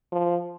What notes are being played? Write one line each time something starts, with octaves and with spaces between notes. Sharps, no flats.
F3